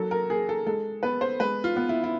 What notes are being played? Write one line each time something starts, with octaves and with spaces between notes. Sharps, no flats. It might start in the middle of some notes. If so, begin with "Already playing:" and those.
Already playing: F#3 A#3 A4
A#4
A#3 G#4
A4
G#3 A4
B3 B4
C5
G#3 B4
F4
B3
E4
E4